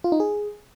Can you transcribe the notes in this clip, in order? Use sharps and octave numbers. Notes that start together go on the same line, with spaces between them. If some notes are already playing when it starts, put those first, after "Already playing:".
F4
D#4
G#4